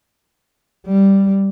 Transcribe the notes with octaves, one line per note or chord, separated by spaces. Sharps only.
G3